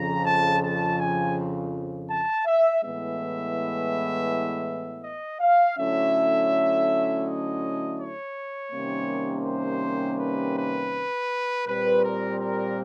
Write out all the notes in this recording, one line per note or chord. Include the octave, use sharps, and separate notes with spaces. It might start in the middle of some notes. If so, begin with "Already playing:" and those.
Already playing: F2 C#3 F3 A#5
A5
A5
G#5
A5
E5
A2 E3 G#3 B3 E5
D#5
F5
D3 F#3 A3 C#4 E4 E5
D#5
C#5
C3 D#3 G3 A#3 C#4
C5
B4
B4
A#2 G3 C4 B4
A#4
A#4